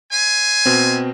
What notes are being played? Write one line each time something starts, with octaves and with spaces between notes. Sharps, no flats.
C5 E5 G#5
B2 C4